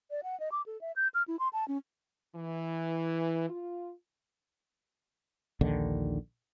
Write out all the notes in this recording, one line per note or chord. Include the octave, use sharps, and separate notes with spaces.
D5
F#5
D#5
D6
A4
E5
G6
F6
E4
C6
A5
C#4
E3
F4
A#1 D#2 D3 D#3